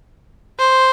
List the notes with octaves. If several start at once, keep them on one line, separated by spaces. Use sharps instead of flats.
C5